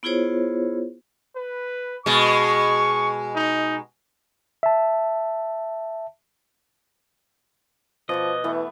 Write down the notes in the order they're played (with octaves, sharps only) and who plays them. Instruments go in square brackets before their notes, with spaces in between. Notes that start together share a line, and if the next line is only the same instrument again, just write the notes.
[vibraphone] B3 E4 F4 G#4 C5 C#5
[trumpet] B4
[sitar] B2 G#3 [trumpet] C#6
[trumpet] D#4
[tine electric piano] E5 A5
[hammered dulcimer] B2 D5 C#6 [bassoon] F3 [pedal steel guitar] D#5
[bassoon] E3 [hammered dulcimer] A3 B3